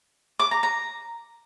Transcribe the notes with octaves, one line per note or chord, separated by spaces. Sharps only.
D6
A#5
A#5